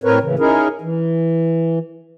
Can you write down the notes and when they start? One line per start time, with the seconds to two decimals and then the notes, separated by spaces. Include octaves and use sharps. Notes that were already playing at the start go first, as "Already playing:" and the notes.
0.04 A2 C4 A#4 B4 C#5
0.22 A2 C#3 E3
0.39 C#4 D#4 E4 G#4 A#4
0.81 E3